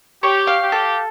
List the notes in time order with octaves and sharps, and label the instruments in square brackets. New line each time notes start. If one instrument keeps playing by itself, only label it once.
[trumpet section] G4 [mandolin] C#5
[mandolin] F5
[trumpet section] G4
[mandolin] A4